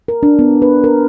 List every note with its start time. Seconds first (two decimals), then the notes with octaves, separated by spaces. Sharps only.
0.08 A#4
0.23 D4
0.39 B3
0.62 B4
0.84 A#4